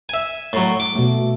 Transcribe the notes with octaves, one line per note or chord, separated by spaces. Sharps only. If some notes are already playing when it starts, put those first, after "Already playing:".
E5 G#5
A2 F#3
D6
B2 A3